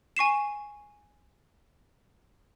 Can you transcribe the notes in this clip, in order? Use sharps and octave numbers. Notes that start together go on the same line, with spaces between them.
G#5 C#6 C7 E7